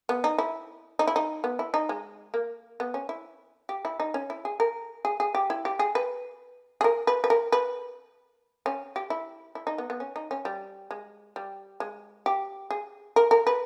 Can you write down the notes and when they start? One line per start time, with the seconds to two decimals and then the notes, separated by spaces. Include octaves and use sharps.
0.09 B3
0.24 D#4
0.38 E4
0.99 D#4
1.07 E4
1.16 D#4
1.44 B3
1.59 E4
1.74 D#4
1.89 G#3
2.34 A#3
2.80 B3
2.94 C#4
3.09 E4
3.69 G4
3.85 E4
4.00 D#4
4.14 C#4
4.30 E4
4.45 G#4
4.60 A#4
5.05 G#4
5.20 G#4
5.35 G4
5.50 E4
5.65 G4
5.79 G#4
5.95 B4
6.81 G#4
6.84 A#4
7.07 B4
7.24 B4
7.30 A#4
7.52 B4
8.66 C#4
8.96 G4
9.10 E4
9.55 E4
9.67 D#4
9.78 B3
9.90 B3
10.00 C#4
10.16 D#4
10.31 C#4
10.45 G3
10.91 G#3
11.36 G3
11.80 G#3
12.26 G4
12.70 G#4
13.16 A#4
13.31 A#4
13.47 B4